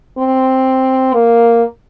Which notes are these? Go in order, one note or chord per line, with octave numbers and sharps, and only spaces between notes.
C4
A#3